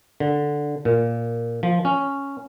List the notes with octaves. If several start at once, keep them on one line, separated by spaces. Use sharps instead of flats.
D3
A#2
F3
C#4